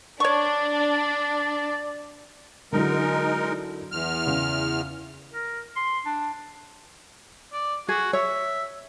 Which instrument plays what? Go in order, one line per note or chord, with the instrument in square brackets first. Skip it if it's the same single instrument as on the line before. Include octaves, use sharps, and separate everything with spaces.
[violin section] D4 [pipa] C#5 C#6 [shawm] D5
[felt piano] D3 F#3 E4 [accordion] G#3 D#4 A#4
[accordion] E2 F6
[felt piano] C#3
[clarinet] A#4
C6
D4
[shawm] D5
[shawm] F#4 [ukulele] G#4
[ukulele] C#5 [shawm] E5